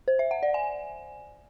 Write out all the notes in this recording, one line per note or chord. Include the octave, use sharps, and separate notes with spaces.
C5
E5
F#5
D5
G#5